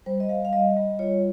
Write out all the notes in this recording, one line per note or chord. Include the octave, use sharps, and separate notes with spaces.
G3 C5
D#5
G3 F5
F5
G3 D#5
G3
F4 C#5